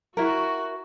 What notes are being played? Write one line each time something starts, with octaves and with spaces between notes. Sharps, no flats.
E4 F#4 A#4